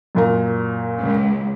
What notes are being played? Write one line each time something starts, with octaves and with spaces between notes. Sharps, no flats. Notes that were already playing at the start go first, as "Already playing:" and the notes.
F#2 A#2 A#5
C#2